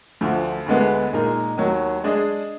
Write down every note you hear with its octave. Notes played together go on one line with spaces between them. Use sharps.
D2 D3 F3
D2 D3 G#3 B3
A#2 G#3 D#4 A#4
D#2 D#3 F#3
G#3 D4 G#4 D#5